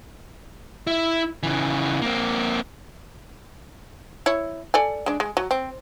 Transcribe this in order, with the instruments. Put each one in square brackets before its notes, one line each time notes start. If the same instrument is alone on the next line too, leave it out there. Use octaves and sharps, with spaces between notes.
[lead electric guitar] E4
C#3 E3
A#3 C4
[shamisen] E4 C#5
A4 D5 G#5
G#3 D4
G#3
F#3
C4